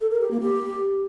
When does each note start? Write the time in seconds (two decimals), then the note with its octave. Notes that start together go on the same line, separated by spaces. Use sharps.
0.01 A4
0.11 A#4
0.21 G4
0.31 A#3
0.41 G4